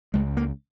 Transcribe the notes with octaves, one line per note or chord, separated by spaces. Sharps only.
C#2 G#3
A#3